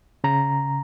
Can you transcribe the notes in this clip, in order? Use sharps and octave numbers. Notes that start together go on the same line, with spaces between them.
C#3 A#5